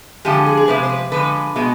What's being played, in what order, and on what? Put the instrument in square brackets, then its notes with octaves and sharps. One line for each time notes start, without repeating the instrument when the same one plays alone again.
[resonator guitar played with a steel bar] D3 F3 G#3 G4
G#4
G#4
C3 F3 G#3 B4
C5
B4
D3 F3 G#3 B4
B2 G#3